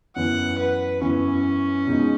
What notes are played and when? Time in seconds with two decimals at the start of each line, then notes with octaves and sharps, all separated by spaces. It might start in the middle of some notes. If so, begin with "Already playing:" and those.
0.16 F#2 E3 B3 E4 F#5
0.58 B4
1.01 F#2 E3 B3 C#4 E4
1.87 B2 G#3 D#4